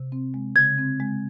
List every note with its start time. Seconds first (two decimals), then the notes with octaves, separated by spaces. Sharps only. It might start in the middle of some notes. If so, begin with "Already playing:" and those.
Already playing: C3
0.12 C4
0.34 G#3
0.56 C#3 G#6
0.78 C4
1.00 G#3